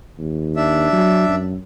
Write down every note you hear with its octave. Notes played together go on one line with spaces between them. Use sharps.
D#2
D4 E5
F#3
F#2